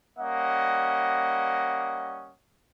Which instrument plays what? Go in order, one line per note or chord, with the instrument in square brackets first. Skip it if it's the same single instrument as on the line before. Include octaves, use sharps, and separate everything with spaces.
[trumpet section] G3 A#3 C#4 D#5 F#5